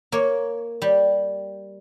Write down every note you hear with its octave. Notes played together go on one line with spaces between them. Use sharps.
A#3 C#5
G3